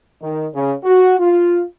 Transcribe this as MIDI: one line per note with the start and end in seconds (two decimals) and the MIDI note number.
0.22 0.47 51
0.54 0.74 49
0.83 1.15 66
1.19 1.63 65